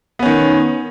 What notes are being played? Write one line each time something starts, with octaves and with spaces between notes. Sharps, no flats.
D#3 B3 C#4